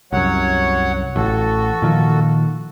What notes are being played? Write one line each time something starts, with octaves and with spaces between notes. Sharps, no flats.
C2 F#2 F#3 C#5 F#5
A1 F#4 A4
A#2 D#3 F3